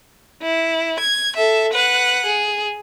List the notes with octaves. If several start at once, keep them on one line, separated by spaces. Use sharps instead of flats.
E4
G#6
A4 E5
B4 F#5
G#4